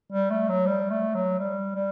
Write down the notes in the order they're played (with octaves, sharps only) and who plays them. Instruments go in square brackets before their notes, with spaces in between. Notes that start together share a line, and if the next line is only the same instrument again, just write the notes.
[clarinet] G3
A3
F#3
G3
A3
F#3
G3
G3